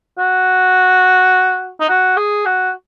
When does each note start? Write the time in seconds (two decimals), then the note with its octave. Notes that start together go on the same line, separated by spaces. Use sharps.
0.18 F#4
1.80 D#4
1.89 F#4
2.17 G#4
2.46 F#4